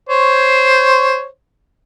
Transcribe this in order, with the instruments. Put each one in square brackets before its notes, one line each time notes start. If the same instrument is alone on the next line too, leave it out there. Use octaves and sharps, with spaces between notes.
[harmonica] C5 C#5